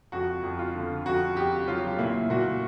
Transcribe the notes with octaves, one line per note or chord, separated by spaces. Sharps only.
F2 F#4
F2
F4
D3
F2 F#4
F2 G4
F#3 F4
A#2 E4
A#2 F#4